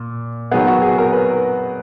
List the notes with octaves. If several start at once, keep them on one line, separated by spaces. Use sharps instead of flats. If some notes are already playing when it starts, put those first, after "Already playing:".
Already playing: A#2
D#3 F#3 B3 G#4
F#4
G#4
A#4
B4